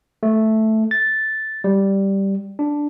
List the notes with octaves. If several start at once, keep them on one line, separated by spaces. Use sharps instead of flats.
A3
A6
G3
D4